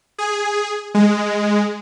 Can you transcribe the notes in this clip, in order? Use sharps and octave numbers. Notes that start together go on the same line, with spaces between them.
G#4
G#3